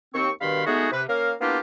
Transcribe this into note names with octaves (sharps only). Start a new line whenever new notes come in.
D#2 C4 C#6
G2 B2 D#3 F5 B5 C6
G#3 A3 B3 D#4 F#4 G#4
C3 B4
A#3 C#4 A#4 F5
A#3 B3 D4 E4 F4 G4